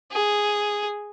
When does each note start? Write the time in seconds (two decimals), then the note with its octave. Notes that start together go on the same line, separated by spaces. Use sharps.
0.12 G#4